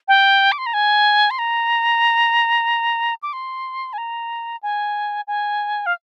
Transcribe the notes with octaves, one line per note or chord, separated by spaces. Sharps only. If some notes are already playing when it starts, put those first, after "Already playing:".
G5
D6
C6
A#5
G#5
C6
A#5
D6
C6
G#5
A#5
G#5
G#5
F5